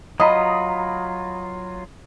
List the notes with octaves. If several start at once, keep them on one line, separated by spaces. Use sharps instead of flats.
F#3 F4 D#5 A#5 B5 D#6